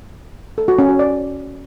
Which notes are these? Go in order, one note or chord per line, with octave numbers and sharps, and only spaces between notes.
A4
F#4
C#4
F#4
D5